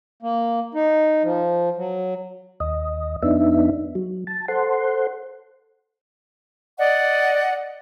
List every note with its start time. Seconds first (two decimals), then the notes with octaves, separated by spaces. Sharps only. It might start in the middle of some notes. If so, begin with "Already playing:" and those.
0.22 A#3
0.74 D#4
1.23 F3
1.77 F#3
2.60 D#2 D#5
3.23 F2 B3 D4 D#4 E5
3.95 F#3
4.27 A5
4.48 A4 C5 F#5 C6
6.78 D5 D#5 F#5